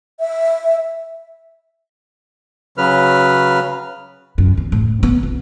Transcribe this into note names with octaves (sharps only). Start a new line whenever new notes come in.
E5
C#3 F#3 B4 F6
F#2
E2
A2
B3
C2